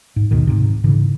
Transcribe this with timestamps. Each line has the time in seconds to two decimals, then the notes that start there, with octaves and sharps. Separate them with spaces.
0.16 G#2
0.31 D2 B2 D#3
0.47 G#2 C3
0.84 G#2 C#3 E3